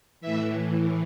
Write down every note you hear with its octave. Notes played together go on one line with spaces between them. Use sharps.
A2 E3 E5